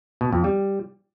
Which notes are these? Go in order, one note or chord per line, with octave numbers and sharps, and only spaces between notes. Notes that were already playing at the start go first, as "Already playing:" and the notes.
B2
F2
G3